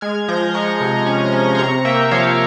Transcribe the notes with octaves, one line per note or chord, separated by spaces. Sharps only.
G#3 F6 G#6
F3 G6 A#6
G#3 A#5 C#6
C3
C#4
C#4
C6
C3 A#5 C#6
A#3 E5 G5
F3 C#5 F5